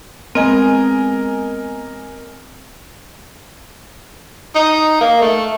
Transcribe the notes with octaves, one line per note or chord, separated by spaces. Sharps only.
G#3 B3 C4 A#4 D#5 G#5
D#4
A#3
A3